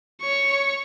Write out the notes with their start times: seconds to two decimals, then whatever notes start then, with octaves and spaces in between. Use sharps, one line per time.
0.21 C#5 C#6